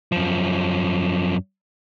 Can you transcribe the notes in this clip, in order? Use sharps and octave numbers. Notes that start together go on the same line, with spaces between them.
F#2 F3